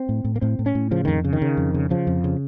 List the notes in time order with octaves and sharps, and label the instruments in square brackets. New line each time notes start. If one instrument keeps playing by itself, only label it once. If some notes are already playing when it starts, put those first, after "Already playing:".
Already playing: [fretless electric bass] C4
A2
A2
A#3
A2 C4
A2
C#4
A2
C#3 F3
F2 D#3
C#3
D#3
C#3
F2
C#3
C#3 F3
F2
C#3